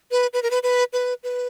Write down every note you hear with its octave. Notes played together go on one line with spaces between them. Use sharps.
B4
B4
A#4
B4
B4
B4
B4